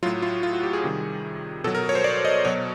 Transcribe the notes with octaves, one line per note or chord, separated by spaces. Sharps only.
A2 F#3 F4
F4
F4
F#4
G4
G#4
C3 D#3 G3
B2 F#3 A4
A#4
C#5
C5
D5
D#5
B2 F#3 C#5